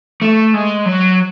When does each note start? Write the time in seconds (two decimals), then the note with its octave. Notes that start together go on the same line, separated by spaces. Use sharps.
0.22 A3
0.54 G#3
0.86 F#3